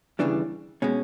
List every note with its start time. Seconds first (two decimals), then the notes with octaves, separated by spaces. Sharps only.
0.19 D#2 C#3 E3 G3 D4
0.82 B2 G#3 C#4